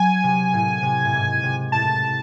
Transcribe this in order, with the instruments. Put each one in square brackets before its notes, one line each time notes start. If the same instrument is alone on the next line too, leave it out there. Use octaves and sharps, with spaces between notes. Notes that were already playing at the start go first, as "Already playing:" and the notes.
Already playing: [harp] F#3 [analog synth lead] G#5
[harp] C3
A2
C3
A2
G#2
C3
[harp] A2 [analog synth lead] A5